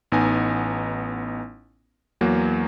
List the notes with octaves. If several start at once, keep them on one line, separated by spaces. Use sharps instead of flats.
A1 B3 D#4 G#5
E2 F#3 A#3